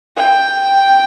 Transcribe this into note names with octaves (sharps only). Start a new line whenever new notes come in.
G5